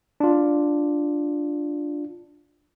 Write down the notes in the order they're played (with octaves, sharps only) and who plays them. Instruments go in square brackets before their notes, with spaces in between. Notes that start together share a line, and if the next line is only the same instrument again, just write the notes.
[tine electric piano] D4 F4